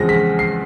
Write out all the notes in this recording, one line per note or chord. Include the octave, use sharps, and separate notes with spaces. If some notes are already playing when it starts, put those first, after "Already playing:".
Already playing: E2 C#3 F3 G#3 C4 A#6
B6
C7